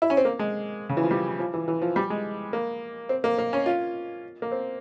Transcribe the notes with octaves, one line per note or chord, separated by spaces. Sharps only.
E4
C#4
C4
A#3
G#3
C#3
E3
F3
G3
F3
E3
E3
F3
G3
G#3
A#3
C4
A#3
A#3
C#4
F4
A#3
C4